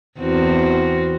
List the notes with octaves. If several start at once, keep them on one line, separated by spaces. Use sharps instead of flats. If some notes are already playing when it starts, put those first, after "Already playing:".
E2 C4 F#4